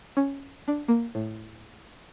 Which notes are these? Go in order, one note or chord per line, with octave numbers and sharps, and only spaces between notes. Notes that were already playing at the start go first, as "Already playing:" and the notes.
C#4
D4
A#3
A2